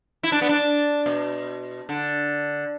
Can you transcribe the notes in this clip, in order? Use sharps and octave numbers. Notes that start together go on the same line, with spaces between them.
E4
D4
B3
D4
B2
D3